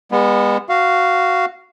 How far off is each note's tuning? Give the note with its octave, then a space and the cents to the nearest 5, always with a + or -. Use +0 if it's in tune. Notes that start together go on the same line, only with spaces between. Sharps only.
G#3 -45 B3 -15
F#4 +0 F5 -10